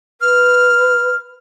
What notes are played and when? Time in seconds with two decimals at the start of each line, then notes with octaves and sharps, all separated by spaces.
0.21 B4 F6